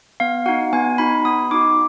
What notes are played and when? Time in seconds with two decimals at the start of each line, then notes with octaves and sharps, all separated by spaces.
0.20 B3 F5
0.46 D#4 F#4 F#5
0.73 B3 G#5
0.98 D#4 F#4 B5
1.25 B3 D#6
1.51 D#4 F#4 D6